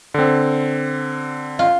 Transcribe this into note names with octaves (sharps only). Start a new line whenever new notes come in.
D3 C4
F4